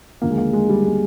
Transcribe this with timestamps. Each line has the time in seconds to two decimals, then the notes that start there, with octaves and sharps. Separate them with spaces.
0.22 D#2 D3 F3 A#3
0.30 G#3
0.37 A#3
0.53 G#3
0.69 G3
0.85 G#3